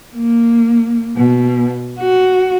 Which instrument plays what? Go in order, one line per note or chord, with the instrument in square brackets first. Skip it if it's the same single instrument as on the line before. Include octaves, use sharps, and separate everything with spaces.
[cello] A#3
B2
F#4